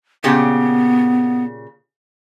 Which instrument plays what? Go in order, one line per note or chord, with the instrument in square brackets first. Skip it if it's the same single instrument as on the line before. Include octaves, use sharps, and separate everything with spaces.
[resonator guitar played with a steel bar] A#2 C#3 G4 [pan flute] B3